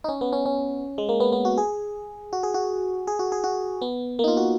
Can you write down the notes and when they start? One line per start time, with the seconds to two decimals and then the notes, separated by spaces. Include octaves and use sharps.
0.04 D#4
0.09 C#4
0.21 B3
0.33 C#4
0.46 C#4
0.98 G#3
1.09 A#3
1.20 B3
1.32 B3
1.45 F#4
1.58 G#4
2.33 F#4
2.43 G#4
2.54 F#4
3.07 G#4
3.19 F#4
3.32 G#4
3.44 F#4
3.82 B3
4.19 A#3
4.24 D#4
4.28 F4
4.37 F#4